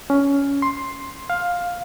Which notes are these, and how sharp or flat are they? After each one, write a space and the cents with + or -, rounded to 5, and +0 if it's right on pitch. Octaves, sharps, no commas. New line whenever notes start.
C#4 +15
C6 +10
F5 +10